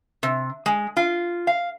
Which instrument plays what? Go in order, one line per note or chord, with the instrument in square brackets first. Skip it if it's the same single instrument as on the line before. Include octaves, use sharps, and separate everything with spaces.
[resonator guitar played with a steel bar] C3
G#3
F4
F5